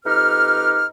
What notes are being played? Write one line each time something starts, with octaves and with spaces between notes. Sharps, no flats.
F2 D#4 G4 B4 F6